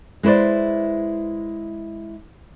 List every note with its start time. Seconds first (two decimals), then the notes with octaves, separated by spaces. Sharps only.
0.23 G#3 E4 B4 C5 D5